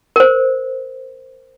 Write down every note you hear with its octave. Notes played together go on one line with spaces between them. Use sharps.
A#4 C5